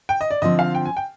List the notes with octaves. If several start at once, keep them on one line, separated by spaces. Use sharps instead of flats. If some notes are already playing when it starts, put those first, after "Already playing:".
G5
D#5
D5
D3 F3 C4 D#5
F5
G5
G#5
G5